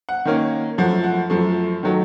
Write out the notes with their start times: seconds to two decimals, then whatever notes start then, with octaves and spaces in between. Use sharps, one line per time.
0.09 F#5
0.25 D#3 A#3 C#4
0.78 F#2 F3 A3 F#5
1.04 F#5
1.30 F#2 F3 A3
1.83 D#3 F#3 A3